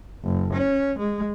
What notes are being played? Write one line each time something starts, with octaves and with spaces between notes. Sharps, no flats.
F#1
C#4
G#3